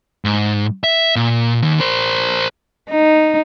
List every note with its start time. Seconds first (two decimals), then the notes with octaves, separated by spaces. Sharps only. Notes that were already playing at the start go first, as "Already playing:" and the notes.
0.25 G#2
0.84 E5
1.16 A#2
1.62 D#2 D#3
1.79 A#4 C5
2.90 D#4